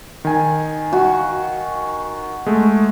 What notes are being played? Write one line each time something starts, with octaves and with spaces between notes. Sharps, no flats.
D#3 G#5
F#4
G#3 A3